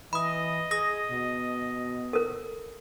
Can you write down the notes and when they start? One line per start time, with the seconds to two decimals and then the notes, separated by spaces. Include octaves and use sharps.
0.13 E3 D#5 B5 D#6
0.71 G#4 D#6 A#6
1.10 B2
2.13 A4 A#4